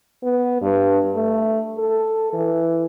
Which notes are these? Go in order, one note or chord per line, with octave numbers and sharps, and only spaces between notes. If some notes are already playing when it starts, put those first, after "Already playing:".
B3
G2
A3
A4
E3